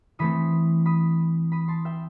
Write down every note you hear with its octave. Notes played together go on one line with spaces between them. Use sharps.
E3 A3 C4 B5 D#6
B5 D#6
B5 D#6
A5 C6
E5 G5